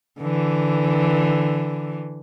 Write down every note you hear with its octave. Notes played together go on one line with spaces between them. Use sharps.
D3 E3